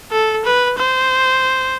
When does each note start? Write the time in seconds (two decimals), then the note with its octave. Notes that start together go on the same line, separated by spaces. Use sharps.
0.12 A4
0.45 B4
0.78 C5